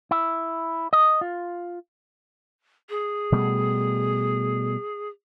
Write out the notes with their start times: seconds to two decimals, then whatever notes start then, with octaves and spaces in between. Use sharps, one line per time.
0.11 E4
0.93 D#5
1.21 F4
2.89 G#4
3.32 B2 G3 A3